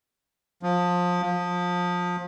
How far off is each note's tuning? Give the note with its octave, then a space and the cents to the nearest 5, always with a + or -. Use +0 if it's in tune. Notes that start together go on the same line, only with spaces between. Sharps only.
F3 +25
F3 +25